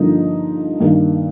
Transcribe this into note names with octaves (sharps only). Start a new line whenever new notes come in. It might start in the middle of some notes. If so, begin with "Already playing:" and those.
Already playing: G2 D3 F3 A#3 D#4
G2 D#3 A#3